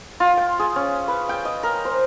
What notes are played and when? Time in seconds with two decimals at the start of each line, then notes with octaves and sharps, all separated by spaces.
0.20 F4
0.37 G5
0.59 G#4
0.76 C#4
1.08 B4
1.29 G5
1.45 D#5
1.63 A#4
1.85 C5